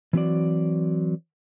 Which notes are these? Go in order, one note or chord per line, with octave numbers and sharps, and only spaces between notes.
E3 F#3 C4 E4 F#4 D5